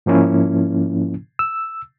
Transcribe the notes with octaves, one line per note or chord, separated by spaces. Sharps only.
G#2 F3 A#3 C#4 E4
E6